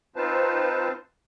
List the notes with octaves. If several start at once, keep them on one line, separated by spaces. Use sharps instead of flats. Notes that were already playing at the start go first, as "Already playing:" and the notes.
C4 D#4 F4 B4 C5 A5